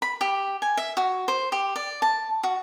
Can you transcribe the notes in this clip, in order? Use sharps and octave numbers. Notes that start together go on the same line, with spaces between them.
B5
G4
G#5
E5
F#4
C5
G4
D5
A5
F#4